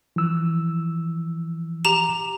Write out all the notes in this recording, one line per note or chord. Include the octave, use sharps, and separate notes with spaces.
E3 F3 E6
G4 A#5 E7